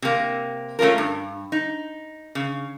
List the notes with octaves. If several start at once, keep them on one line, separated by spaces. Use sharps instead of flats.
C3 A#3
A3 C#4 D#4 F4 A#4
G2
D#4
C#3